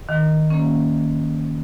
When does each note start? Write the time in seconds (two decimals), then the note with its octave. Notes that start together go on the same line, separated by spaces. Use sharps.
0.09 D#3
0.50 A#3 C#4